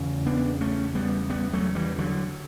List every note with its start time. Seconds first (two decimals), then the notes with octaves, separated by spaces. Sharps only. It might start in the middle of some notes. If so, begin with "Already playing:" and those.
Already playing: E2 C#3
0.26 B3 D4
0.61 A3 C#4
0.95 G3 B3
1.30 G3 B3
1.53 F#3 A3
1.75 E3 G3
1.98 D3 F#3